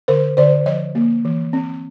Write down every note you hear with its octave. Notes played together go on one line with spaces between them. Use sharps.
D3 A#4 C5
D3 C5 D5
F3 C#5 D#5
A#3
E3
C4